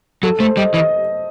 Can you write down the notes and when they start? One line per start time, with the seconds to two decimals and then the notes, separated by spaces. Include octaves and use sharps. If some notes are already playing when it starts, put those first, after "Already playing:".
0.23 F#3 A4
0.40 A3 C5
0.57 G3 D#5
0.74 E3 D#5